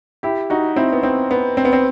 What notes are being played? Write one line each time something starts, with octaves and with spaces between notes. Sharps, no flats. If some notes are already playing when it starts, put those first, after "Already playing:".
E4 G4
D#4 F#4
C4 E4
B3
C4
B3
C4
B3
C4